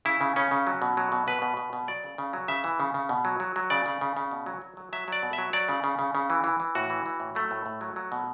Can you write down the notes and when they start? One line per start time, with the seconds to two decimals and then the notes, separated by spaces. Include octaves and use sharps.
0.05 C#3 E4
0.21 C#3
0.36 C#3 C#4
0.51 C#3
0.67 F#3
0.82 B2
0.97 F#3
1.12 B2
1.27 B2 B4
1.42 B2
1.57 B2
1.73 B2
1.88 F#3 D5
2.04 C#3
2.18 C#3
2.33 F#3
2.48 C#3 E5
2.64 E3
2.80 C#3
2.94 C#3
3.09 B2
3.25 F#3
3.40 F#3
3.56 F#3
3.70 C#3 D5
3.86 C#3
4.01 C#3
4.17 C#3
4.31 B2
4.46 F#3
4.62 F#3
4.77 F#3
4.93 F#3 E5
5.08 F#3 D5
5.23 B2
5.33 E5
5.38 F#3
5.53 F#3 D5
5.69 C#3
5.84 C#3
5.99 C#3
6.15 C#3
6.30 E3
6.44 E3
6.60 E3
6.75 A2 F#4
6.90 E3
7.06 E3
7.20 A2
7.35 F#3 A3
7.51 A2
7.66 A2
7.81 F#3
7.96 F#3
8.12 B2